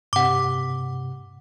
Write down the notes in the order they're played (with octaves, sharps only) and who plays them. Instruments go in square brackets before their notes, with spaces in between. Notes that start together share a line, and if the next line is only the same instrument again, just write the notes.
[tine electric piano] G2 C3 [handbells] F#5 D6